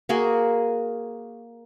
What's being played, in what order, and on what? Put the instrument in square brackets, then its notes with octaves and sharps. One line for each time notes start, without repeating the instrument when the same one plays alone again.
[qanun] A#3 F#4 G#4